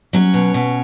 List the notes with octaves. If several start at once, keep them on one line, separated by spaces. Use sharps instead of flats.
F#3 C#4
B2
B2